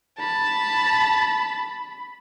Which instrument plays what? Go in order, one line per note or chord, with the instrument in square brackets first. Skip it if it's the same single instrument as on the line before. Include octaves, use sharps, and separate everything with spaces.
[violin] A5 [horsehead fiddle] B5